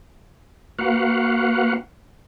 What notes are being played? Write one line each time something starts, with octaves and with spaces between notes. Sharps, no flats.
A#3 F#4 B4 F5 F#5